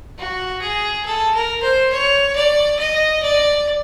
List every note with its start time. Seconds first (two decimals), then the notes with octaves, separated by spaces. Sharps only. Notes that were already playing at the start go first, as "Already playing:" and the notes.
0.19 F#4
0.61 G#4
1.05 A4
1.34 A#4
1.62 C5
1.92 C#5
2.36 D5
2.79 D#5
3.23 D5